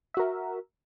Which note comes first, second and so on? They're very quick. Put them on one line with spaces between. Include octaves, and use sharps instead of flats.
E5 F#4 A#4